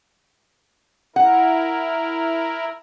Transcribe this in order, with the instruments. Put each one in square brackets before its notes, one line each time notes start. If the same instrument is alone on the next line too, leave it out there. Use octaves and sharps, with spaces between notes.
[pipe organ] E4 A#4 [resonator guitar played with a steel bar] F#5